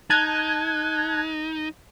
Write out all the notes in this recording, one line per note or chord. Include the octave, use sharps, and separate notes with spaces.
D#4 A5 F#6 G#6